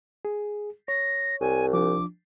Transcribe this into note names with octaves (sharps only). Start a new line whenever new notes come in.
G#4
C#5 A#6
C2 G#5
F3 D4 D6